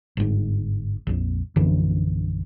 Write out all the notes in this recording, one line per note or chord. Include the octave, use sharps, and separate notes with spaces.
G1 G#2
A#1 F2
A#1 F#2 D3 E3